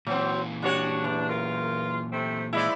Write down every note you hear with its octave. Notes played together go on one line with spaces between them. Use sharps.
A#2 E3 F#3 C4
G3 D4 F#4 C#5
E2
F4 A#4
C3 A3 C4
G#2 F3 G#3 E4 D5